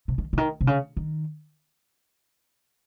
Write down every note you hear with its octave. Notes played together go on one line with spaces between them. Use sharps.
C3
D#3
C#3
D#3
C3
C#3
D#3